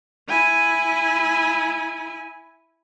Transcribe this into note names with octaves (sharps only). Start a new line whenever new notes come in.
E4 G#5